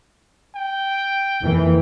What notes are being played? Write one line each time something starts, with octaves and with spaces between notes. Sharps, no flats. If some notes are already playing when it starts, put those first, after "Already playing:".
G5
F2 E3 A#3